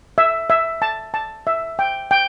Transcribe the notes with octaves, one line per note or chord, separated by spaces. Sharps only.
E5
E5
A5
A5
E5
G5
G5